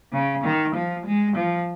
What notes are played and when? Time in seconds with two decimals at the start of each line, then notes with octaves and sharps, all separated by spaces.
0.13 C#3
0.44 D#3
0.75 F3
1.06 G#3
1.36 F3